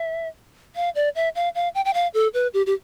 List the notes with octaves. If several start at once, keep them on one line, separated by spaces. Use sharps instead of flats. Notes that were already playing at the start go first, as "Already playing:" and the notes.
Already playing: E5
F5
D5
E5
F5
F5
G5
G5
F5
A4
B4
G4
G4